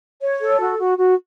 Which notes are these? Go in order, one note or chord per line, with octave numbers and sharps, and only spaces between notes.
C#5
A4
F#4
F#4
F#4